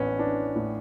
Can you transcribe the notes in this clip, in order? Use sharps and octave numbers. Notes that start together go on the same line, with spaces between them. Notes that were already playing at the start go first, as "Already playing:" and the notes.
Already playing: A1 A2 B3 C#4 D4
E3 D4
A2